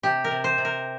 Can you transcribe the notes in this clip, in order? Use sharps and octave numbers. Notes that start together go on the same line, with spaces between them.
C3 G4
A#4
C3
C5
C3
A#4